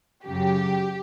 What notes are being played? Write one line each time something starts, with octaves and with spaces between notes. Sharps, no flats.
F#2 C#3 F#3 G4